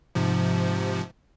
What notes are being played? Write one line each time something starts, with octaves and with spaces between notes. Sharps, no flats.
G#2 C3 F3